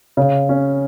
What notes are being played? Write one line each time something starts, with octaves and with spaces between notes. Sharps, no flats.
C#3
C#4